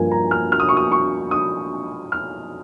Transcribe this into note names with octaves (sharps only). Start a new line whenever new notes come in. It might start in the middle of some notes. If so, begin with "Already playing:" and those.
Already playing: G2 F3 A#3 A#4 G#5
A#5
F6
F6
D#6
C#6
D#6
C#6
D#6
F6